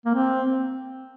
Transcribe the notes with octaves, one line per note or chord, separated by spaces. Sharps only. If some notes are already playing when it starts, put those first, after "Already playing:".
A#3
C4